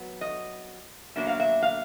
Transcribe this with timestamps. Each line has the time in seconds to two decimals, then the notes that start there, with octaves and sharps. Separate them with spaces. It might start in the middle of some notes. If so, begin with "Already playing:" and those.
Already playing: F#3 B3
0.21 D#5
1.16 B2 F#3 A#3 D4 E5
1.27 F5
1.40 E5
1.62 F5